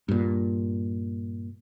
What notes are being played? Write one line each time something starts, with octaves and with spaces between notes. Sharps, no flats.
G2 A#2